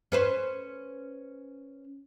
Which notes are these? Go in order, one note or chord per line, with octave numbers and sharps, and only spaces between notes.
C#4 B4 C5